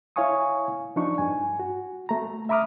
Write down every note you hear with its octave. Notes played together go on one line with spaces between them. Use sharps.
E4 C#5 F5 G#5 C#6 D#6
F3 D4 D#4 C#6
G2 G#5
F#4
A3 A#5
E5 A#5 B5 D6 D#6 F6